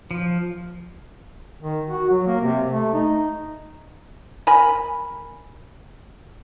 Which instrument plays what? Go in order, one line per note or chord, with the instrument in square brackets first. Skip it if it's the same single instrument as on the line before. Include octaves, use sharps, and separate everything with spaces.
[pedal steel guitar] F3
[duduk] D#3
F#4
F#3
A#3
C3
A3
D#4
[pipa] A#4 G#5 B5